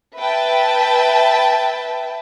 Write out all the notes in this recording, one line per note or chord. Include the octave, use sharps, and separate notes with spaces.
B4 E5 G5 A5